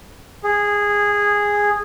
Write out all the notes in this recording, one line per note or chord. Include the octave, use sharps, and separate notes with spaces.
G#4